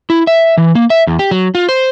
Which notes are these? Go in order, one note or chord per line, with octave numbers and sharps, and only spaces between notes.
E4
E5
E3
A#3
E5
E2
G4
F#3
F4
C5